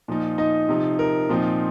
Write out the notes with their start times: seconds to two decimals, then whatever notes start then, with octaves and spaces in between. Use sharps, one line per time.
0.08 A#2 F3 D#4
0.38 D#4 D#5
0.69 C3 F3 D#4
0.99 A#4
1.29 A#2 F3 C4 D#4